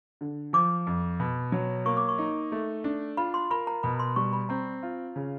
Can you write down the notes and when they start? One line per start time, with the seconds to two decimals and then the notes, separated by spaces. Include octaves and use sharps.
0.21 D3
0.53 F3 D6
0.87 F2
1.20 B2
1.52 F#3
1.85 A#3 C#6
1.97 D6
2.09 C#6
2.18 D#4
2.52 A3
2.84 D4
3.17 F4 B5
3.34 C6
3.50 A#4 B5
3.67 A#5
3.83 B2 B5
3.99 C6
4.16 G3 C#6
4.33 B5
4.49 C4 A#5
4.83 F4
5.16 C#3